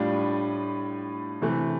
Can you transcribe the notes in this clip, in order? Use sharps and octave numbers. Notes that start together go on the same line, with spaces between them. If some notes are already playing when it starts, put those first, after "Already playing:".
Already playing: A2 G3 D4 F4
C3 E3 A3